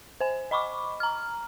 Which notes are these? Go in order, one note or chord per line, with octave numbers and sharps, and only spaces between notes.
C5 G#5
D#5 B5 C#6 D6
A#5 F6